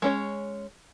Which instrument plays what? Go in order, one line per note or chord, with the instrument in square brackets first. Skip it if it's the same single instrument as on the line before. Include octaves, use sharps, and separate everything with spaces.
[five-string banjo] G#3 C#4 C#5